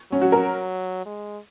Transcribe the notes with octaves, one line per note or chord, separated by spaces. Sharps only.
F#3 C#4
F#4
A#4
G#3